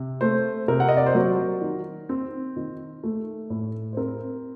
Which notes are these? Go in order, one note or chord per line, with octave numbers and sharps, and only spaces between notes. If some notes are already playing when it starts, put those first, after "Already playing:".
Already playing: C3
A3 C5
C3 A#4
F#5
D#5
D5
C5
F#3 A#4
D#3
C4
D#3
A3
A2
C5
C4 A#4